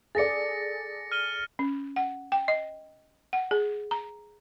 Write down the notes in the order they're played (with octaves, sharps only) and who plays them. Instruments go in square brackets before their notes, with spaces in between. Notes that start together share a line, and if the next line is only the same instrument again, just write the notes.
[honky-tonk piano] G#4 A4 D5 [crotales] A6 A#6 C#7
[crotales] F6 D#7 G7
[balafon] C#4
F#5
G5
D#5
F#5
G#4
A#5